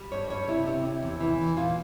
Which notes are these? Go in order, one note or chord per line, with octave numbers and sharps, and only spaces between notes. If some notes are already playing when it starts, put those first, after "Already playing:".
Already playing: G3
G2 C#5
G2 C#5
C3 E4
C3
C3
E2
E3
E2
A#2 F4